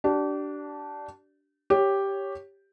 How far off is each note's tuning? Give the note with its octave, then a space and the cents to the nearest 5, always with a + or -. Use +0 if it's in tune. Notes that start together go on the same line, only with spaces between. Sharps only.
D4 -5 G4 -35
G4 +0 C#5 +0